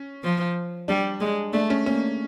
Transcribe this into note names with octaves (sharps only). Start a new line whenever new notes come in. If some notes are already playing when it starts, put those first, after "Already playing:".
Already playing: C#4
F3
G3 D4
G#3
A3 D4
C#4
A#3 C#4